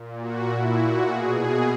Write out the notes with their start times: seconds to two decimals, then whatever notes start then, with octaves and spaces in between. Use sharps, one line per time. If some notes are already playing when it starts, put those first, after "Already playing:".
Already playing: A#2
0.20 F#4
0.50 A#2 E4
0.79 F#4
1.09 B2 G#4
1.39 G#4